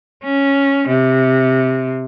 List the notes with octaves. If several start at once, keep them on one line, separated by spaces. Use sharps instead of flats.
C#4
C3